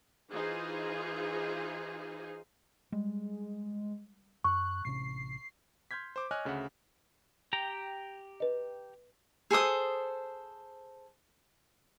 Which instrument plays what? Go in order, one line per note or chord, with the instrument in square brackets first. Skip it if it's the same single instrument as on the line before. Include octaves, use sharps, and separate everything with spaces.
[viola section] E3 D#4 F4 G#4 C5 G#5
[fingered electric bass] G3 [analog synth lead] G#3
[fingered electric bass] F#2 [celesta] C#6 [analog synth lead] F#6
[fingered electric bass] A1 C3 C#4 [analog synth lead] C7
[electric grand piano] C6 F6 G6 G#6 B6
C5 D6
C#5 D#5 G#5 F6 F#6
D2 C#3 E5 F#5
[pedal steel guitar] G4 G5 A#5
[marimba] B4 D#5
[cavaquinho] G#4 A4 C5 D#6